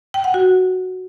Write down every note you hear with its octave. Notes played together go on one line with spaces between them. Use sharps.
G5
F#5
F#4